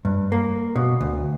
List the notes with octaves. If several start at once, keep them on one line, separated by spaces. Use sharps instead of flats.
G2
A#3
B2
D2